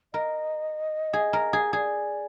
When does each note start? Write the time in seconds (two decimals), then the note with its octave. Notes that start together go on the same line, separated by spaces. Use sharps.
0.14 A#4 D#5
1.13 G#4
1.33 A#4
1.53 G#4
1.73 G#4 D5